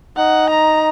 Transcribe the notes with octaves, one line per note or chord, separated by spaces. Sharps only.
D#4 F#5
A#5